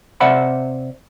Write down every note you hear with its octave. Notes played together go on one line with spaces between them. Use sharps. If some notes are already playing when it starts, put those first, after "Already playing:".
C3 C5 D5 E5 F#5 B5